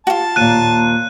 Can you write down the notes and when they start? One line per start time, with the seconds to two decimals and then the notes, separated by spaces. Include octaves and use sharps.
0.07 F4 F#4 A5
0.36 D#2 A#2 F#6 D#7